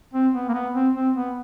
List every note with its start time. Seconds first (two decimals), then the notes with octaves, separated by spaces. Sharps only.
0.13 C4
0.34 B3
0.48 A#3
0.54 B3
0.74 C4
0.95 C4
1.15 B3